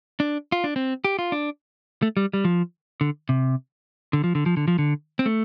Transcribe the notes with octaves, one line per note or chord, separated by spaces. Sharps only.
D4
F4
D4
C4
G4
F4
D4
A3
G3
G3
F3
D3
C3
D3
F3
D3
F3
D3
F3
D3
C4
A3